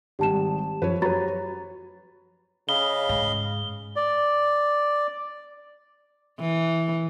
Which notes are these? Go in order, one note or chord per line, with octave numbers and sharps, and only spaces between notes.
G#1 G3 G4 A5 E7
F#2 F3 B4 C#5
F#3 F#4 G4 B4 C#5 A#5 B5 A6
C#3 D#5 F5 B5 G7
G#2
D5
E3